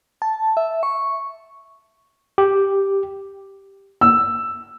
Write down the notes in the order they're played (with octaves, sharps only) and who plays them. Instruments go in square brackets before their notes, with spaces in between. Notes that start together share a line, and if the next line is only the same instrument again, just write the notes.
[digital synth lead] A5
E5
C#6
[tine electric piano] G4
[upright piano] E6